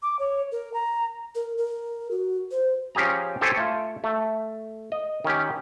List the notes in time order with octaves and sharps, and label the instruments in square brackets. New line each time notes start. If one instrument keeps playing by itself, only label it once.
[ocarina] D6
C#5
A#4
A#5
A#4
A#4
F#4
C5
[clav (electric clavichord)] F3 C#4 G4 G#4 A#5
G4 A4 C5 C#5 G#5
A3 F4
A3
D#5
D#3 C#4 G4